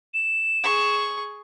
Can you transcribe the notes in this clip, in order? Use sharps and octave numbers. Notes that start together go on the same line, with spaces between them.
E7
G#4 C#6